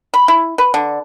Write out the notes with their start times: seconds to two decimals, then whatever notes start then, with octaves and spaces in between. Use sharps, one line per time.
0.14 B5
0.28 E4
0.58 B4
0.74 D3